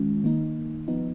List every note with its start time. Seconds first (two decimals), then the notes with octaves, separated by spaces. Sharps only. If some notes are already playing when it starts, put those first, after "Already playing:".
Already playing: D#3 G#3 C#4 F4
0.24 D#3 A#3 D#4
0.88 F3 B3 D#4